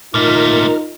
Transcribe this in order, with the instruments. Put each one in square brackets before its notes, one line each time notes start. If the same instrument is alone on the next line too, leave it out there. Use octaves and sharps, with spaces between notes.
[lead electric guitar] A#2 A3 [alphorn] D#4 [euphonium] F4 [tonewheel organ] A#4 F6